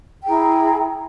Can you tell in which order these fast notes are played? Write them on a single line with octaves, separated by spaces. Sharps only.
G5 G#4 E4 A#5